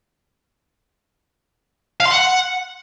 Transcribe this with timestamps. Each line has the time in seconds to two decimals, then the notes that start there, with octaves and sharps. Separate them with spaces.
2.00 F5
2.06 C6
2.11 F#5